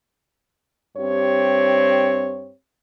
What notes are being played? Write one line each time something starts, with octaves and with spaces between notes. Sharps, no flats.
G2 C4 G4 C#5